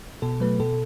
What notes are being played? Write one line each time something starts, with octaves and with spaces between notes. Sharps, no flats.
B2 A4
F#3 A3 B4
B2 A4